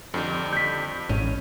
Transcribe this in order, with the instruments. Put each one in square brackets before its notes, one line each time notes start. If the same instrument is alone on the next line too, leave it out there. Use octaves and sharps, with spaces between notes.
[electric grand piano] F2 [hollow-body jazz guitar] D3 D#3 G3
[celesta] G6 B6
[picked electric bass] A1 G#2 [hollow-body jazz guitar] C#4